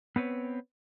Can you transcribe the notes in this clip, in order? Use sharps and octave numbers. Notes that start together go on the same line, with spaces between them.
B3 C4 B4 C#5